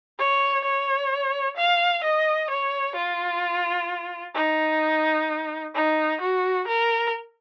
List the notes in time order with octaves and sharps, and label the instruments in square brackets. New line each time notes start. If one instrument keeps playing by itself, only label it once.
[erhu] C#5
C#5
F5
D#5
C#5
F4
D#4
D#4
F#4
A#4